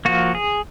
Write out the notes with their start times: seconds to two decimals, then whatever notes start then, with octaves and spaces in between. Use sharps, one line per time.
0.05 F3 A#3 F#4
0.35 G#4